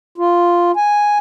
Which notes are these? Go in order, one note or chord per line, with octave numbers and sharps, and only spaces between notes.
F4
G#5